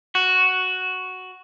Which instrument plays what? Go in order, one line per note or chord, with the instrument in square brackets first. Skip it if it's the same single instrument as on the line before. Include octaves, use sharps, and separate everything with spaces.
[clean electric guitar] F#4